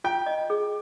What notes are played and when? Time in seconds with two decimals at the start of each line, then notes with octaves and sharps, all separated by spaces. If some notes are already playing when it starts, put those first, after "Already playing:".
0.04 F4 G5
0.26 D#5
0.50 G#4